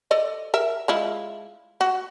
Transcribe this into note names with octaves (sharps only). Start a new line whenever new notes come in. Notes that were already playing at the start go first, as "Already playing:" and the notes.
A4 D5 D#5
A#4 E5
G#3 E4 F4
F#4